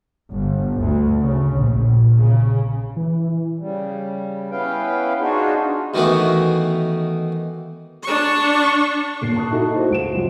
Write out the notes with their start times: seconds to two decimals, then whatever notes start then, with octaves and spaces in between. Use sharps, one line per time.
0.31 G1
0.81 D2
1.20 C#3
1.55 A#1
2.17 C#3
2.96 E3
3.59 C#3 G3
4.51 B3 C#4 E4 B4 F5 G5
5.19 D4 D#4 F4 F#4 G#4
5.94 B2 D#3 E3 A3 B3 F#4
8.03 D4 C#6
9.21 D#1 C7
9.36 A5 C#6 D#6 F#6
9.51 D#4 E4 F#4 A4
9.76 D#4 F#4 C5
9.90 C#2 D7 E7
10.14 F#2 C3 F3 F#3